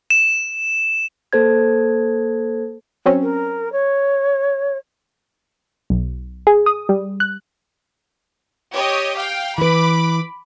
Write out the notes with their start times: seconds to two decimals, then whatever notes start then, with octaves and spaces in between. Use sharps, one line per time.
0.10 E7
1.33 A#3 A4 C5 G#6
3.06 F#3 C4 C#4
3.23 A#4
3.72 C#5
5.90 B1
6.47 G#4
6.66 D#6
6.89 G3
7.20 F#6
8.72 G4 C#5 D#5
9.17 F5 G5
9.58 E3 B4 B5 D6